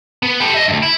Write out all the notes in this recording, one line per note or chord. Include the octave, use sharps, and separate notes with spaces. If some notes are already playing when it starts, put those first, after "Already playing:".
B3
G4 A4
D#5 E5
D2 G2
E4